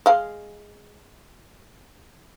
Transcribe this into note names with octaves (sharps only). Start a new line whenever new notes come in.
G#3 F5